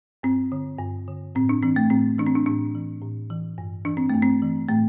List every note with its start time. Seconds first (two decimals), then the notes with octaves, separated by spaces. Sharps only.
0.23 G2 C4
0.52 D3
0.79 G2
1.08 D3
1.35 A2 C4
1.49 D4
1.63 E3 C4
1.76 A3
1.90 A2 C4
2.18 E3 D4
2.27 C4
2.35 D4
2.46 A2 D4
2.75 E3
3.02 A2
3.30 E3
3.58 G2
3.85 E3 D4
3.97 C4
4.10 G2 A3
4.22 C4
4.42 E3
4.68 A2 A3